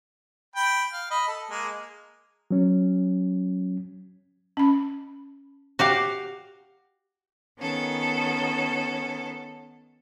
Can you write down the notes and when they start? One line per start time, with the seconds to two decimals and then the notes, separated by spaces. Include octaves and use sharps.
0.56 G5 B5
0.93 F5
1.11 D#5 B5
1.28 A4
1.50 G#3 A#3
2.51 F#3 C#4
4.57 C#4 B5
5.79 F#4 G4 F5
7.59 D#3 B3 C#4 A4